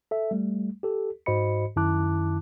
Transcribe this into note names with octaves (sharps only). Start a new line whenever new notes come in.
A4 E5
G3 A3
G4 A4
G#2 F#4 C5 D#5 B5 C#7
F#2 D#3 E4 A5 D6 F#6